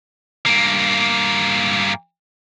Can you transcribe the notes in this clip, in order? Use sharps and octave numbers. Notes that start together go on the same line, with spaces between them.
G2 A#3